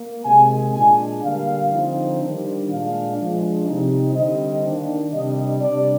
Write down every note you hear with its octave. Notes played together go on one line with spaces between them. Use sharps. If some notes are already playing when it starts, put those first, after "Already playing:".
Already playing: A#3
C3 D#3 G#3 G#5
A#2 G#3 D4 G#5
D3 G3 A#3 F5
D3 F3 C4 D#4
D#3 G3 D4
A#2 G#3 D4 F5
F3 G#3 D4
C3 G3 C4 D#4
D3 G3 C4 D#4 D#5
D#3 A#3 D4
C3 G3 D4 D#5
C3 G3 D4 D5